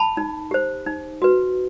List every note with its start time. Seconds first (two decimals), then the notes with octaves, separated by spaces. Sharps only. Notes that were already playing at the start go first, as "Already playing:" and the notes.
Already playing: A5 B5
0.17 D#4
0.51 G4 C5
0.86 D#4
1.22 F#4 B4